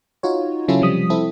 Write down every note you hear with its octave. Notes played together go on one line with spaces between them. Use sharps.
D#4 F4 F#4 C#5
C#3 F#3 C#4 E4 F4 A4
C3 F3 G3 D#6 B6
C4 E4 A4